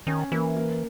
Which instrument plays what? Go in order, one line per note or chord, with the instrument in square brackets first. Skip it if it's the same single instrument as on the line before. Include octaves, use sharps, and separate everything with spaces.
[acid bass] D#3 [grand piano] C#4
[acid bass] E3 [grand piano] A#3
[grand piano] A#3